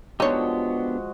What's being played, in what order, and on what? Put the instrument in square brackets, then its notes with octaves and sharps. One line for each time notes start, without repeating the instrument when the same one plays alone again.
[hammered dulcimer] F3 G#3 F#4 [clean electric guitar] B3 D4 G4 [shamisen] D#4 C#5